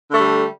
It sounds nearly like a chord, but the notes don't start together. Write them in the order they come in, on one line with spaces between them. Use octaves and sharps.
D3 A3 G3